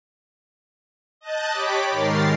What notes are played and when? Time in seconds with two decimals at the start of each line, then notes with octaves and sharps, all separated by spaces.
1.21 D#5 A5 F#6 G6 A6
1.51 G4 C#5 B5 D6 B6
1.90 G#2 D#3 A#4 A6 C7